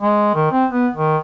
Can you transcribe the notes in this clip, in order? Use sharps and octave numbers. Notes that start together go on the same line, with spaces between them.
G#3
D#3
C4
B3
D#3